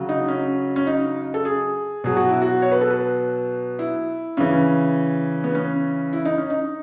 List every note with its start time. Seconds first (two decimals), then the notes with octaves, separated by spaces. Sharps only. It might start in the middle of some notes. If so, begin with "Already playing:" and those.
Already playing: C#3 F#3
0.09 D#4
0.28 C#4
0.76 C#4
0.87 D#4
1.34 A4
1.45 G#4
2.04 B2 F#3 G#4
2.16 F#4
2.29 E4
2.42 F#4
2.62 C#5
2.72 B4
2.81 A4
2.91 B4
3.79 E4
4.37 C#3 E3 C#4
5.44 B3
5.55 C#4
6.13 E4
6.25 D#4
6.37 C#4
6.50 D#4